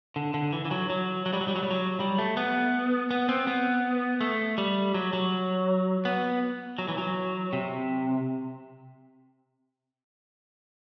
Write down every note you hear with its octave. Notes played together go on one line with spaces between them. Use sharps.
D3
D3
E3
E3
F#3
F#3
F#3
G3
F#3
G3
F#3
G3
F#3
G3
A3
B3
B3
C4
B3
A3
G3
F#3
F#3
B3
F#3
E3
F#3
C3